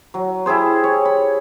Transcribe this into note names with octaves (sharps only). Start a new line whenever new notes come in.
F#3
E4 G4 G#4 C5
C#5
B5